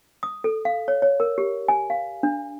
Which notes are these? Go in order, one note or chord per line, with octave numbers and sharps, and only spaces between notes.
D#6
A4
F5
C#5
C#5
A#4
G4
G#5
F5
D4